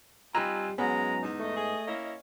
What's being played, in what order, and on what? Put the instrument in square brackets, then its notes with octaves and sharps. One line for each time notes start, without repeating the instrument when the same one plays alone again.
[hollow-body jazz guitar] G3 A#5 [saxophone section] C4 D#4 F4 [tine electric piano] G#5 E6 F#6
[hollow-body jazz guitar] G#2 B3 [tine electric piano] F#3 C#4 [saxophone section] G#3 G#4 [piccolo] A#5
[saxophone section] E2 D#4
[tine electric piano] A3 [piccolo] D#5
[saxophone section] G#4
A#3 C#4 E4